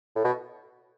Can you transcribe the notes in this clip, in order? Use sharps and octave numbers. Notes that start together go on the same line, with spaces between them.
A2
B2